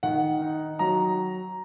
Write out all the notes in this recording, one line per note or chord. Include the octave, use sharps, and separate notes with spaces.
D#3 F#5
D#4
F#3 A#5